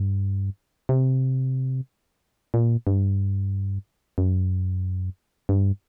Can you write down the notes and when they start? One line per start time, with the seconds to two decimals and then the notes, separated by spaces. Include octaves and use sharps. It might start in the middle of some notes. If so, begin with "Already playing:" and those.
Already playing: G2
0.89 C3
2.54 A#2
2.87 G2
4.18 F#2
5.49 G2